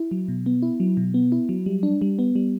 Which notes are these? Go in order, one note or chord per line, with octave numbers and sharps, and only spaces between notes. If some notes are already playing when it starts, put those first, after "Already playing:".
Already playing: E4
F#3
B2
B3
E4
F#3
B2
B3
E4
F#3
G3
D4
G3
B3
G3